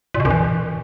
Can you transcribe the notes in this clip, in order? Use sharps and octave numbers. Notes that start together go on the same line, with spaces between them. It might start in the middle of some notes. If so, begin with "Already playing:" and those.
A#2
B2
F#2
E3